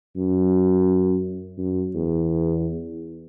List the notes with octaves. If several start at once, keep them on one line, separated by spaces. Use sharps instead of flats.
F#2
F#2
E2